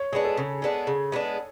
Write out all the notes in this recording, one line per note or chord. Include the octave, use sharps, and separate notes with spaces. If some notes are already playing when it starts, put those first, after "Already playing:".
Already playing: C#5
G#3 B3 D4 G#4
A4
C#3
G#3 B3 D4
C#3
G#3 B3 D4